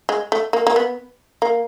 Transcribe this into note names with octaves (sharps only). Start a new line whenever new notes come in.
G#3
A3
A#3
A#3
B3
A#3